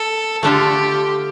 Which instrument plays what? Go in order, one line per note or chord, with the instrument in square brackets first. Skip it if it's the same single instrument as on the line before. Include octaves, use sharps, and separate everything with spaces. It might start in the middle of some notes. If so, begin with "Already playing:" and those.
Already playing: [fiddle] A4
[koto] D3 A3 D4 F4 A4 [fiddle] G4